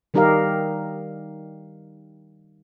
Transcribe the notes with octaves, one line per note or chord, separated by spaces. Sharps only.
D#3 G3 D#4 G4 A#4 F5